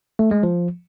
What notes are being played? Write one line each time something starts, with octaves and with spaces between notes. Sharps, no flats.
A3
G#3
F3